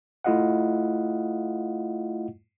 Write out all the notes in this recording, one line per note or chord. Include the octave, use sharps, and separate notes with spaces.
A3 E4 F4 D#5 F5 F#5